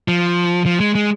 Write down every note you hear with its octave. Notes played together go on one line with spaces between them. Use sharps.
F3
F3
G#3
G#3